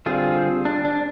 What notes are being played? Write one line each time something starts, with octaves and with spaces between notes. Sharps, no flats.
D3 G3 C4 F4 G#4
D4
D4